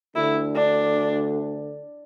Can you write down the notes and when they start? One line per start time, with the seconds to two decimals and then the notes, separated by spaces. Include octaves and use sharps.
0.16 D2 D3 E4
0.55 D4